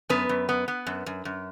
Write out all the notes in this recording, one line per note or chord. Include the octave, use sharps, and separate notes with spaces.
F#2 B3 B4
F#2
B3
B3
F#2
F#2
F#2